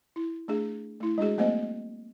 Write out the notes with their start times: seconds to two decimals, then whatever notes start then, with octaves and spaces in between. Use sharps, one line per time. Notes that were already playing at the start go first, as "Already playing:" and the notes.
0.16 E4
0.48 A3 D4 G#4
1.00 A3 E4
1.18 G#3 D4 F#4 G#4
1.38 F#3 A3 A#3 C4 C5 D#5